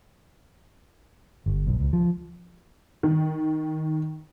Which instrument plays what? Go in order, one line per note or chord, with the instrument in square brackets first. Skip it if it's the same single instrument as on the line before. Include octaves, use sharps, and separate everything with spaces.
[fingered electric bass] G1
B1
C#2
F3
[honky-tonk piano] D#3